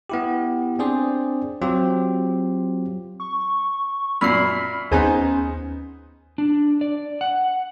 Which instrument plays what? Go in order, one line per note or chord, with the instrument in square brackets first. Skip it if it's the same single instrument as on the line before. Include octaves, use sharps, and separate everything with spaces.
[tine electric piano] B3 E4 G4
C4 D4 G#4 C5 D5
F#3 C4 F4 G4
[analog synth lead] C#6
[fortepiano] F#2 A#2 [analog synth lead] B5 [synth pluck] F6 C7
[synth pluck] D#2 G#4 G#5 [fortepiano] B3 D#4 C5 [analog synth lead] C#4
[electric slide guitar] D4
D5
F#5